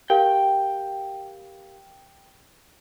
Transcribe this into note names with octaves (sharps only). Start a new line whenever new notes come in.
G4 A#4 F5 G5